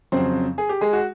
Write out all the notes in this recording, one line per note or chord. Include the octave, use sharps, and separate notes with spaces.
F2 C#3 F#3 C4 C5
G#4
G4
G#3 G#4
F#4